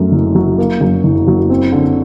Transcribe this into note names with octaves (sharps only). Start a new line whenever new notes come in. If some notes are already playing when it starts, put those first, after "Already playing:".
Already playing: F#2 A3
F#1
F#3
A#3
F#2
F#1
F#3
C4
D3